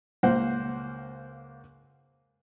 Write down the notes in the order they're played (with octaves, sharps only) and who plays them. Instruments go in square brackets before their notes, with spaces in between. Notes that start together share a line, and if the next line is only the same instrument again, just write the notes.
[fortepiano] C#2 A#3 A#4 C5 F#5